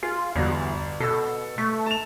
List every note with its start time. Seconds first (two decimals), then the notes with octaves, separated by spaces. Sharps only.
0.03 F4 G#4
0.35 G1 E2 F#4
1.00 B2 A4 E6
1.58 A3 C#6
1.86 A5 F7